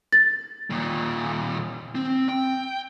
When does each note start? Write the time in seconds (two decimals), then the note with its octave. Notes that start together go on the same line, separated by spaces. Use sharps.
0.13 A6
0.70 D#2 A#2
1.95 C4
2.29 G5